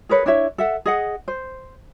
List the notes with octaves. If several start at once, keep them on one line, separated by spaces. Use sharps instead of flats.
G#4 A#4 B4 C#5
D4 E4 C#5 E5
A4 E5 F#5
G#4 D#5 F#5
C5